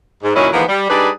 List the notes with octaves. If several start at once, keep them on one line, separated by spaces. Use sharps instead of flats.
G#2
F#2 A#2 D#3 F#3 C#4 E4
D#2 E3 F3 G#3 B3 A#4
G3
G3 D4 D#4 G#4 B4 D5